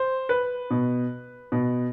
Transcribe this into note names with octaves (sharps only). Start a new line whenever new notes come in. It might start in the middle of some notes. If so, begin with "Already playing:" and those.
Already playing: C5
B4
B2
B2